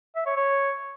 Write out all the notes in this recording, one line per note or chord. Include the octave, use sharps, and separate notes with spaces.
E5
C#5
C#5